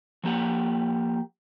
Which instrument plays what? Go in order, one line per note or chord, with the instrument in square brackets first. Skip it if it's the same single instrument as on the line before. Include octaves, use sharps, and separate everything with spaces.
[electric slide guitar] F3 A#3 G4 F#5